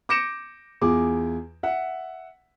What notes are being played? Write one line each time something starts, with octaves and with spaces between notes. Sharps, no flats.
D6 G6 A#6 C#7 D7 E7
E2 F4 G#4 D6
E5 F#5